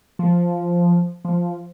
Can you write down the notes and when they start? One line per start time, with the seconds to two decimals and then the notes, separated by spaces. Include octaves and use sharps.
0.19 F3
1.25 F3